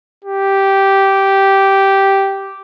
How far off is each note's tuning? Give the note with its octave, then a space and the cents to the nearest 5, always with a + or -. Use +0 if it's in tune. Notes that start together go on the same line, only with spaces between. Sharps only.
G4 -10